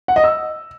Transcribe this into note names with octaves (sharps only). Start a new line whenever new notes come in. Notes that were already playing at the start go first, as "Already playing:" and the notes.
F#5
D#5
E6